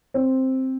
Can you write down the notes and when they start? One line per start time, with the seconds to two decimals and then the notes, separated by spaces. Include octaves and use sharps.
0.14 C4